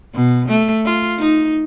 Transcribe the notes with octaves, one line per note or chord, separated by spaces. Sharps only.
B2
A3
F4
D#4